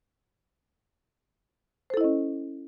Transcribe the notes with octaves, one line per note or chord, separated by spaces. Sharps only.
C#4 E4 A4 C5 D#5